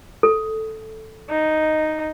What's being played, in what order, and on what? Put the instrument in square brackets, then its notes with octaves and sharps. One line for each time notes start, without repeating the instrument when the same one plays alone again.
[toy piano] A4
[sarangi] D#4